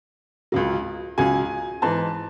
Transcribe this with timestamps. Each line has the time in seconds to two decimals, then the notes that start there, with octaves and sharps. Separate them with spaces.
0.52 C#2 C#3 F#3
1.18 C#2 C#3 F#3 G#5
1.82 G#2 E3 A5